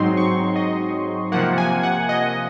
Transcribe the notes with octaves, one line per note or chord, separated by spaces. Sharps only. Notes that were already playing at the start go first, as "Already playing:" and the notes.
Already playing: G#2 F#3 C4 D#4 C6
C#6
D#5
C3 F3 A#3 F#5
G#5
F#5
D#5